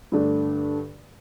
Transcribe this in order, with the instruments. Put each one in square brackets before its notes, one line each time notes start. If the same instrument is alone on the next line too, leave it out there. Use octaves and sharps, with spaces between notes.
[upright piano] G2 D3 A3 D4